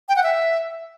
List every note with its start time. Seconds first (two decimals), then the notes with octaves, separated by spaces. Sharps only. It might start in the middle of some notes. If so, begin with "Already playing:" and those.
0.09 G5
0.16 F#5
0.23 E5